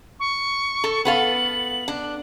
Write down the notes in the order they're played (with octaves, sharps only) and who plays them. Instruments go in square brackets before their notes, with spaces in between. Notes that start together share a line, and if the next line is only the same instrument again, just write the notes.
[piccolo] C#6
[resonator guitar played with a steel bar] A4
[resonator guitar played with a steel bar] B3 A4 F5 [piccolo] F#7
[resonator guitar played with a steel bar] D4